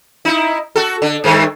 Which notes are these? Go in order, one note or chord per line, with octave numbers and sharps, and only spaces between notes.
D#4 E4
F#4 A4
D3
G2 D#3 A3